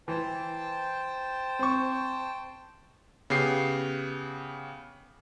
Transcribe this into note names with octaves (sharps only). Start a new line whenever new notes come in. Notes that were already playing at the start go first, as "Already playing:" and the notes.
E3 C5 G5 A5
C4 C#6
C#3 B3 G4 C7